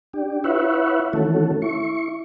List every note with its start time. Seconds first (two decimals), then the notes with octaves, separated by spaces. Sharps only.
0.13 D4 G4
0.44 E4 F4 B4 C#5 E5 F#5
1.13 D#3 E3 A3 C#4 F#4 A4
1.62 E4 C#6